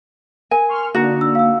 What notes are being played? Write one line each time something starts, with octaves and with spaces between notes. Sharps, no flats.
A#4 G#5
C6 C#6 F6
D3 A#3 D4 D#4 F#4
E6
F5 E6